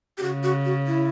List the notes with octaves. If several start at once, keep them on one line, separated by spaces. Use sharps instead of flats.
G4
C#3 F#4
F#4
F#4
E4